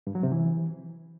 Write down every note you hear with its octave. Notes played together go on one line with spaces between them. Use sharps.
G2
F#3
C3
E3